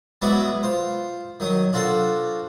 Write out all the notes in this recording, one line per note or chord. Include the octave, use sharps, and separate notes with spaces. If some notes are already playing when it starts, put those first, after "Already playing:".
F#3 G#3 B3 E4 F#4 D5
F4 C5
D#3 F#3 D#6
D4 F4 F#4 A4 C5